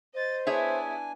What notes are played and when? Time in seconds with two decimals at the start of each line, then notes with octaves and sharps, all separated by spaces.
0.14 C5 D#5 A6
0.47 B3 D4 E4 G#4 C#5 E5 G#5